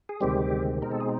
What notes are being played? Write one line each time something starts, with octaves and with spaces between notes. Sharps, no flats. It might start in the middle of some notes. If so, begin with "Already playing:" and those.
G#4
D2 C3 D#3 G3 G#3 C4 G4
B2 G#3 C4 D#4 A#4
A4
G#4